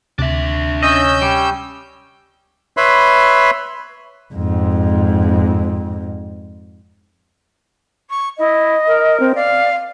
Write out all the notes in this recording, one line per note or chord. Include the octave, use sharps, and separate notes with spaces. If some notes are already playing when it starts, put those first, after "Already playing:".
D2 C3 D4 E5
C#4 D#5 E6 G6
G3
B4 C#5 E5 B5 C6
F2 G#2
C#6
E4 D#5
A#4
C4
D5 F5